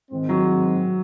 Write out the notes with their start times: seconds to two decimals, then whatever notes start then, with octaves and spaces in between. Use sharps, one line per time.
0.11 G#2 D#3 G#3 C4
0.29 F#3